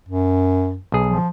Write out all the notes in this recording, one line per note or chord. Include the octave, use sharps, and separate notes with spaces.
F#2
B1 G#4
F3